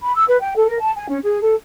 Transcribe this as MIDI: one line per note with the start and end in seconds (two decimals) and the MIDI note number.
0.02 0.14 83
0.15 0.25 88
0.27 0.40 71
0.40 0.54 79
0.56 0.67 69
0.68 0.80 70
0.81 0.92 81
0.96 1.05 80
1.08 1.18 61
1.23 1.39 68
1.41 1.54 69